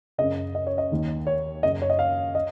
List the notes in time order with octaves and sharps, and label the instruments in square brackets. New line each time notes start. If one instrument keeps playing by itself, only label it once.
[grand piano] F#2 C#3 D#5
D#5
C#5
D#5
D#2 D#3
C#5
F#2 C#3 D#5
C#5
D#5
F5
D#5